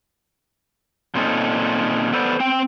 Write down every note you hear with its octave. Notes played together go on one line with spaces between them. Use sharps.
A#2 C4 C#4 D#4 A4
B3 A4 B4 C5 D5
C4 G5